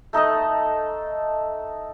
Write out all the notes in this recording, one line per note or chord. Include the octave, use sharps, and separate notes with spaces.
A3 D#4 A4 D#5